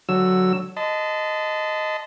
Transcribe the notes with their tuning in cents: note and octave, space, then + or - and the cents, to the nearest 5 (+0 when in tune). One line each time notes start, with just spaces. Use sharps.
D3 +0 F#3 +0 E6 +0
D#5 +0 A5 -5 C6 -35